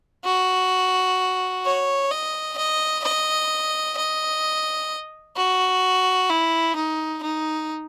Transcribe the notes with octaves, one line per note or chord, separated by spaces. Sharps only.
F#4
C#5
D#5
D#5
D#5
D#5
F#4
E4
D#4
D#4